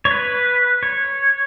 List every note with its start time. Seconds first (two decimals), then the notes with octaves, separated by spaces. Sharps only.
0.05 C#5
0.11 B4
0.83 C#5